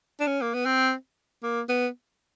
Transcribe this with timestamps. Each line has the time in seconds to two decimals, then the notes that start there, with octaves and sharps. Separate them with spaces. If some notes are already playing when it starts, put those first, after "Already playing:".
0.20 D4
0.27 C#4
0.42 A#3
0.54 B3
0.66 C4
1.43 A#3
1.69 B3